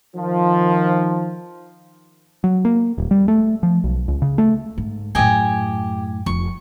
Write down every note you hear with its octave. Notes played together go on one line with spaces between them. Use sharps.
D#3 F3
F#3
A#3
D#1
G3
A3
F3
B1
C#2
C#3
A3
G#2
F#2 A2 G4 D#5 G#5
F1 F3 C#6